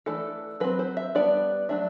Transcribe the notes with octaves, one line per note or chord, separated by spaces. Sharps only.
E3 A3 D4 A4
F#3 C4 B4
C5
E5
G3 B3 D4 D5
F#3 A3 D4 E5